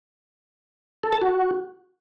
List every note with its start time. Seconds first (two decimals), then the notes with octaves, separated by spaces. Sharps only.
1.03 A4
1.12 A5
1.21 F#4